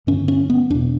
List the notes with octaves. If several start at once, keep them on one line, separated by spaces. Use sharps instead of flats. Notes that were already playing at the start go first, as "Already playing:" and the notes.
G2 D3 C#4
C#4
B3
E2 B2 D4